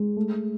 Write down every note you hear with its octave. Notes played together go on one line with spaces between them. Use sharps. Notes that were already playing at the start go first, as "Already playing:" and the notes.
Already playing: G#3
A3